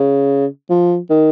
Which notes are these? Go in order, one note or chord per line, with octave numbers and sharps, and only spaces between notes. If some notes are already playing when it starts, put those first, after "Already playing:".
Already playing: C#3
F3
D#3